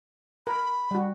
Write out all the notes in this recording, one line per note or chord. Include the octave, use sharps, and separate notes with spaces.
A#4 B5
G3 F#4